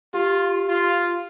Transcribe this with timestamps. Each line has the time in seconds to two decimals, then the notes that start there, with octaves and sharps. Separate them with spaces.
0.14 F4 G4
0.68 F4